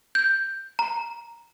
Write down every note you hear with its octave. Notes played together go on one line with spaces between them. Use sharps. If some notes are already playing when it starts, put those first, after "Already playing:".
G6
A#5